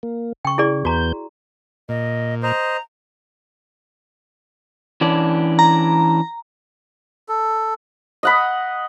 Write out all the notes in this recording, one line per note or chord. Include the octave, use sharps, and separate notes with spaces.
A#3
C#3 G5 C#6
E4 G#4 D5
E2 B3 F#4 A#5 G6
A#2 D#5
C5 D#5 A#5
E3 C#4 D4
A#5
A4
D#5 F#5 B5